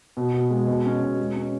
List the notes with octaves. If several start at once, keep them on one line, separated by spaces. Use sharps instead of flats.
B2
B2
G#3
B2
C#4
B2
G#3
C#4